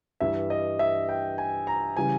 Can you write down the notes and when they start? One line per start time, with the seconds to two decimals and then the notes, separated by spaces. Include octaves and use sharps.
0.20 G2 E3 G3 E5
0.50 D#5
0.79 E5
1.09 G5
1.38 G#5
1.67 A#5
1.97 C#3 E3 G3 G#5